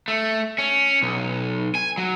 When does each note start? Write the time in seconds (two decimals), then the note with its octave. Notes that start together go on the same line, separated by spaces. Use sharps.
0.08 A3
0.58 C#4
1.02 B1
1.75 G#5
1.98 F#3